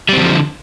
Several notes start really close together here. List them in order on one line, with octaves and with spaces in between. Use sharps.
G3 C4 D#3 F3 D3